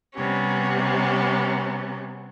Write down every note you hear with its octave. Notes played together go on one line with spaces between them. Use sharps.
C3 G3 B3 C#4